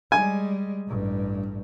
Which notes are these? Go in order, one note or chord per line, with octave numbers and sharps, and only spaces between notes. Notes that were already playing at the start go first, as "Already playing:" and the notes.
G3 G#3 G#5
A1 G2